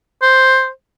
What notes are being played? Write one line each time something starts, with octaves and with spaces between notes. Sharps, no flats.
C5